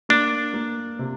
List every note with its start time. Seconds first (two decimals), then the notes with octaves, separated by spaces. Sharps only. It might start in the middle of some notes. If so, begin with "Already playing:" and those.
0.09 A#3 D4
0.54 A#3
0.99 C3